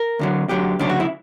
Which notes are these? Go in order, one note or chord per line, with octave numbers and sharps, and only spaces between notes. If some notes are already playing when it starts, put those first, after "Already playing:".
Already playing: A#4
D2 D3 F#3
D2 D3 F#3 G4
D2 C#3 F#3 D4
F#4
E4